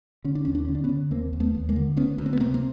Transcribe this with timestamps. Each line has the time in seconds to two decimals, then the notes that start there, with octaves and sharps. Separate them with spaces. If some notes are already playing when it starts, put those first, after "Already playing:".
0.24 D3 C#4
0.35 D4
0.45 D#2 C#4
0.55 D4
0.65 D3 C#4
0.75 D4
0.84 B3 C#4
0.89 D3
1.11 D#2 A#3 C4
1.33 D#2
1.40 A3 B3
1.55 D#2
1.69 G#3 A#3
1.76 D3
1.97 D2 B3 C#4
2.18 D2
2.26 C4
2.33 B3
2.40 C3 A#3 C4
2.54 A#3 C4